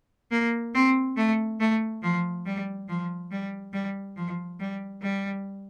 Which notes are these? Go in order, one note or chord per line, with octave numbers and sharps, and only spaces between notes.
A#3
C4
A3
A3
F3
G3
F3
G3
G3
F3
G3
G3